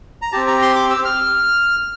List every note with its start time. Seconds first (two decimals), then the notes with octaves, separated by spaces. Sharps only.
0.22 A#5
0.32 C4 G4 A5
0.47 A#5
0.62 C6
0.76 D6
0.90 E6
1.05 F6